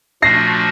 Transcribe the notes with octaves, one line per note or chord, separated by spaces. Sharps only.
A#2 F3 A3 D4 F#4 A#6 C7